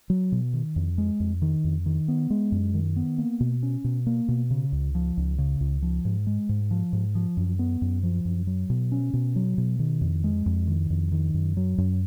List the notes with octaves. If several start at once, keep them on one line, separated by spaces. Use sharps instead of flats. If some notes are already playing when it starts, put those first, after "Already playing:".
F#3
B2
D#3
F2
G#3
F2
D#3
F2
D#3
B3
G#3
F#2
D#3
B3
A#3
B2
C#4
B2
A#3
B2
C#3
C#2
F3
C#2
C#3
C#2
F3
G#2
G#3
G#2
F3
G#2
F3
F#2
B3
F#2
F3
F#2
F#3
B2
C#4
B2
F#3
B2
D#3
F2
G#3
F2
D#3
F2
D#3
F#2
F#3
F#2